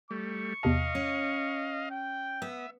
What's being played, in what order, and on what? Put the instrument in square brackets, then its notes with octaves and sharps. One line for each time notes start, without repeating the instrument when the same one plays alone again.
[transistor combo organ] G3 A3 [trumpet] C#6
[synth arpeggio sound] E2 C3 A5 [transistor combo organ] D#5 F5
[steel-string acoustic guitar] C#4
[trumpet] G5
[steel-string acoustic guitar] B3 [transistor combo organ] E5